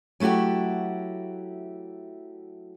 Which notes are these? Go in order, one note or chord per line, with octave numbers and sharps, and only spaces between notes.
F#3 A3 E4 F#4 G4